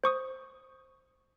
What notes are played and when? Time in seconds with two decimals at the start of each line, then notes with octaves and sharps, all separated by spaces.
0.04 C5 C#6 D#6